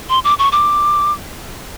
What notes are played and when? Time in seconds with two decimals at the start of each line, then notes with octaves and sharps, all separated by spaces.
0.09 C6
0.24 D6
0.39 C#6
0.52 D6